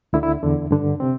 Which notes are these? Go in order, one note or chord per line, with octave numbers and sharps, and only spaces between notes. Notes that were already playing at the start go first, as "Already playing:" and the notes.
D2 D3 E4
E4
E2 D3
G2 D3
C3 C4